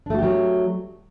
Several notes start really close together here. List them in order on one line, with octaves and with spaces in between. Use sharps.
D4 A3 F#4 G4 F#3